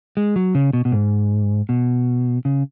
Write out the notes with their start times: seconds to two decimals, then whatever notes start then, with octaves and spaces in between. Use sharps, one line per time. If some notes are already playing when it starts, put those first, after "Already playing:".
0.17 G#3
0.36 F#3
0.55 C#3
0.73 B2
0.85 B2
0.92 G#2
1.69 B2
2.45 C#3